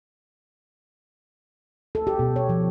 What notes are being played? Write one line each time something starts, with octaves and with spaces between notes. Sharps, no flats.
A4
G4
B2
C#5
F3